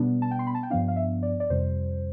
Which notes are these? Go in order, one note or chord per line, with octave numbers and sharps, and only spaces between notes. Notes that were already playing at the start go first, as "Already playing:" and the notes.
Already playing: B2 G3 B3 D4
A5
G5
C6
B5
A5
G5
G2 F3 B3 D4 F5
F5
E5
D5
D5
F2 C3 G3 C5